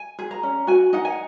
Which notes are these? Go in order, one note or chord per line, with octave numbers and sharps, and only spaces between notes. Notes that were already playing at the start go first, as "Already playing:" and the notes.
Already playing: G#5
G#4
A#5
C#4
F#4 G#5
D#4 F#5
G#5